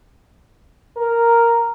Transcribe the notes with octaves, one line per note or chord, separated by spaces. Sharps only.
A#4